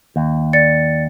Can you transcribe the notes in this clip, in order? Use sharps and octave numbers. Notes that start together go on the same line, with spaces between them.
D#2
D5 A6 C#7